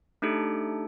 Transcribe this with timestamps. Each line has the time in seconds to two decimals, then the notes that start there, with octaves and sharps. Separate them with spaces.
0.22 A3 D4 D#4 G4 A4